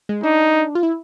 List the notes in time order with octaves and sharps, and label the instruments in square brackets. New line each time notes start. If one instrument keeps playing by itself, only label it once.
[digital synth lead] G#3
[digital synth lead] D4 [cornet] D#4
[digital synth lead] F4
E4